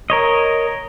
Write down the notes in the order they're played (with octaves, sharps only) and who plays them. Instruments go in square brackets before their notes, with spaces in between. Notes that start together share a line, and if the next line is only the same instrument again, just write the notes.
[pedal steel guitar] A#4 C#5 D#5